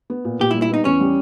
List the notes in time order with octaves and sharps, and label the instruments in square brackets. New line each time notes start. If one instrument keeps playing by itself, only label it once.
[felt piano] B3
A#2
[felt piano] A#2 [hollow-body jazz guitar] G4
[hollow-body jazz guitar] E4
[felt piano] G3
[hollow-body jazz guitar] E4
[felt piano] B3 [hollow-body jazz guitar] D#4
[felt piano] E2 [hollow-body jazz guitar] C#4
[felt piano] G3